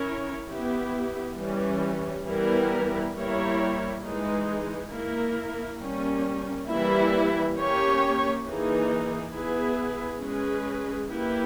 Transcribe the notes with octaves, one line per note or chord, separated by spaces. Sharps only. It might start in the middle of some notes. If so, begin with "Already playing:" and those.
Already playing: C#4 E4 A#4 C#5
B3 E4 G4
E3 G3 C#4
E3 G3 B3 E4 A#4
G3 A#3 E4 A#4 C#5
E3 G#3 D#4
A#3 E4 A#4
G3 A#3 C#4
E3 G3 A#3 E4
A#3 C#4 G4 C#5
E3 A#3 D#4 G#4
B3 E4 G#4 B4
G#3 C#4 G#4 B4
A#3 E4 G4 B4